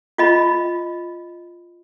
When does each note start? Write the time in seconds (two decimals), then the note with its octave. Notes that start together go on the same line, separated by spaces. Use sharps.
0.18 F4 D#5 B5